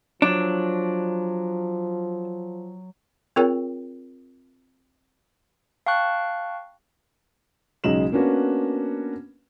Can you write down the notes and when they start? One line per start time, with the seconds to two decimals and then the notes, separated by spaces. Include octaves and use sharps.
0.22 F3 F#3 D4
3.36 C4 F4 G#4 A#4 C#5 G5
5.86 F5 G5 A5 C#6 F#6
7.84 B1 C#3 G#3 D#4 E7 F#7
8.12 A#3 B3 C#4 D4 F#4 B4